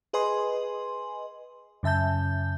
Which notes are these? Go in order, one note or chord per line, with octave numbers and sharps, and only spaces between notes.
G#4 B4 D#5 G#5 C6
F#2 C#3 E5 A5 G6